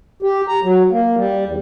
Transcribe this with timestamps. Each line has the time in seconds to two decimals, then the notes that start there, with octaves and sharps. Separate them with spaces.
0.22 G4
0.48 A#5
0.63 F#3
0.91 A#3
1.16 G3
1.45 E2